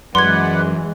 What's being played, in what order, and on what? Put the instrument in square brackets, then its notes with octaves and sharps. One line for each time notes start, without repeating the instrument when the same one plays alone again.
[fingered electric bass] F#2 [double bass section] E3 G#3 [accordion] B4 D5 F#5 [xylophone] C6 G#6